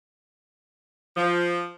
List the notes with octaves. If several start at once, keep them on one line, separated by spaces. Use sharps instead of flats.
F3